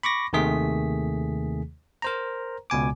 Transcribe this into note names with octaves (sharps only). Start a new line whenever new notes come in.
B5 C#6 D6 A#6
D#2 C3 D#3 A3 G#4 B6
A#4 C5 A#5
C#2 B2 G#5 D6